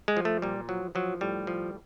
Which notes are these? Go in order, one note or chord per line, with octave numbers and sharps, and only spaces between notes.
G#3
F3
A3
A#2 G3
F3 F#3
F3 F#3
A2 G3
F3